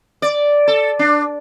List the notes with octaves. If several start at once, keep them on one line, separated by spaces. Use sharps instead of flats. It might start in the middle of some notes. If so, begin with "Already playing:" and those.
D5
A4
D4